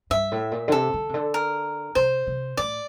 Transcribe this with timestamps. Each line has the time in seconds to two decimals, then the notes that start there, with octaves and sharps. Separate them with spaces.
0.10 G2 E5
0.32 A2
0.52 A#2
0.68 D3
0.72 C3 A4
0.93 D3
1.09 C3
1.14 D3
1.34 A#4
1.95 C3 C5
2.27 C3
2.57 A2 D5